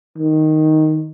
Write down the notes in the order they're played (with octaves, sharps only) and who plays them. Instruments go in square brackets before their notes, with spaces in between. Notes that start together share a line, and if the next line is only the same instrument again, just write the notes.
[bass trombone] D#3